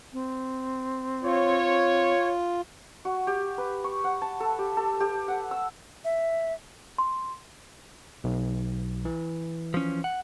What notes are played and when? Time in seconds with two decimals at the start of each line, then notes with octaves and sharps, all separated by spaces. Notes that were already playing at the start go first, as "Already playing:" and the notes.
0.13 C4
1.23 F4 C#5
3.05 F#4
3.27 G4
3.58 B4
3.84 C#6
4.04 F#5
4.22 A5
4.40 A4
4.59 G4
4.77 A4
5.00 G4
5.28 F#5
5.51 E6
6.05 E5
6.98 C6
8.24 B1
9.05 E3
9.74 F3 C#4
10.04 F#5